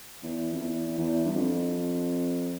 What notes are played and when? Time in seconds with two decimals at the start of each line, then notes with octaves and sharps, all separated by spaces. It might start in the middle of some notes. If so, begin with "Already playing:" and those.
0.23 E2
0.53 F2
0.60 E2
0.98 E2
1.25 G2
1.35 F2